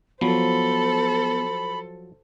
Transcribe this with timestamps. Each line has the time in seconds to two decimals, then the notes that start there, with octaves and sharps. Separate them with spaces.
0.21 F3 F#3 B3 A4 C5 B5